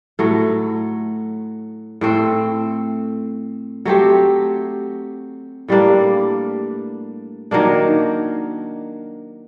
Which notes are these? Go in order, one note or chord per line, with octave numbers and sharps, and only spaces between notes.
A2 F#3 A3
A2 A3 C4
F#3 A3 C4 G4
A2 G3 A#3 D4
D#3 F#3 A#3 D4